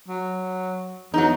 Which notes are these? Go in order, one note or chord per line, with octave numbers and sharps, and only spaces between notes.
F#3
E2 F#3 D#4